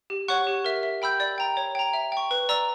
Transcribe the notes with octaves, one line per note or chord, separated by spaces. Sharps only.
G4
C#5 F#5 C#6 F#6
G4
A#4 E5
E5
G5 B5 E6 G6
D5
G5 A#5
C#5
G5 A#5
E5
G5 C#6
B4
D5 A#5 E6